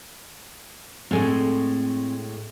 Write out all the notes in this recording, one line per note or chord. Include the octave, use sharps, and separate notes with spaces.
A2 G#3 A3 C4 A4 G#5